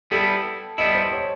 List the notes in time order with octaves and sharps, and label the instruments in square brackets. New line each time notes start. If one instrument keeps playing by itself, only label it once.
[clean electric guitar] G3 B3 E4 [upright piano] A4
[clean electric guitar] G3 B3 E4 [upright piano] D#5
[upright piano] C5
C#5